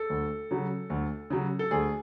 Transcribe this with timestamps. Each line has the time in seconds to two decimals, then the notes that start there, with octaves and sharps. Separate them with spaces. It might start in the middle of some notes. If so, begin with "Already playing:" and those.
Already playing: A4
0.10 D2
0.51 C#3 F#3
0.90 D2
1.30 C#3 F#3
1.59 A4
1.71 D2 G#4